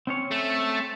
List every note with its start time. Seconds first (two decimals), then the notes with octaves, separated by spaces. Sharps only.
0.07 C4 C#4 C#5
0.31 A3